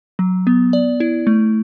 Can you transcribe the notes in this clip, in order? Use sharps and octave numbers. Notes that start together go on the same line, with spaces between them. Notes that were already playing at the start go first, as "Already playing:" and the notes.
F#3
B3
D5
E4
A3